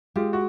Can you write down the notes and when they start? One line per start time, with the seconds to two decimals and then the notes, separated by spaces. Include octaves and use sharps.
0.16 G#3 F4 G4
0.33 F#4